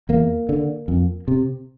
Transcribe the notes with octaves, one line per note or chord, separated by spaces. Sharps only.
E2 A#3
D3
F2
C3